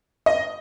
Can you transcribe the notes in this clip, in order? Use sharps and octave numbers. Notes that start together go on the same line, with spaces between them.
D#5